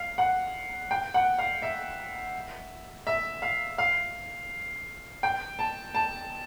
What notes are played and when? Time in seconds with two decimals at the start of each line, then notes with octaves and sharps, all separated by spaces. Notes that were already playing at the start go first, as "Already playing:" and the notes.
Already playing: F5
0.18 F#5
0.91 G5
1.14 F#5
1.39 F5
1.62 E5
3.07 E5
3.42 F5
3.78 F5
5.23 G5
5.59 A5
5.95 A5